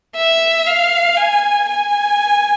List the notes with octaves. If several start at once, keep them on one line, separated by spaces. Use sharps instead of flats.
E5
F5
G#5
G#5